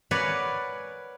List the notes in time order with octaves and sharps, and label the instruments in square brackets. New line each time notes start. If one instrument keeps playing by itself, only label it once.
[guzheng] A#4 B4 C#5 D5 F#5 G#5